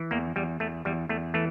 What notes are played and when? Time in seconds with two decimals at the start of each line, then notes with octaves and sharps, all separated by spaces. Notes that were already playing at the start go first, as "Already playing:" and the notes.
Already playing: E3
0.11 E2 A#3
0.36 E2 G3
0.60 E2 A3
0.85 E2 G3
1.09 E2 A3
1.34 E3 A3